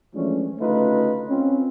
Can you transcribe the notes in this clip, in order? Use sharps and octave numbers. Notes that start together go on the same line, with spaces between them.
E3 F3 G#3 A3 C#4 D4
D2 C#3 A3 D#4 F4 B4
C4 C#4 F4